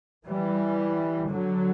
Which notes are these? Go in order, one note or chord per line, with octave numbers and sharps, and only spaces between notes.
E3 G3
D3 F#3